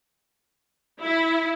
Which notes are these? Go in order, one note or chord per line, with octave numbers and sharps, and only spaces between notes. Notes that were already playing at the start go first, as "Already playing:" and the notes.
E4